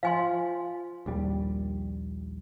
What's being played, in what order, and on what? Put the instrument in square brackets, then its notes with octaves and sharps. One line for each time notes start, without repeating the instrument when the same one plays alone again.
[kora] F3 [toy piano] F5 G#5 C6
[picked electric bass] A#1 D#2 G3